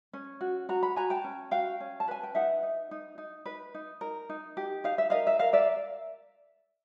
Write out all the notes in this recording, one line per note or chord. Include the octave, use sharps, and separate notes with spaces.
C#4
F#4
F#4 A#5
B5
F#4 G#5 A#5
G5 A5
C#4
F#4 F5 G5
C#4
A5
B4 G#5
G5
D#4 E5 F#5
D#4
D#4
D#4
B4
D#4
A#4
D#4
G4
D#4 F5
E5
A#4 D#5 F5
E5
A#4 F5
D5 E5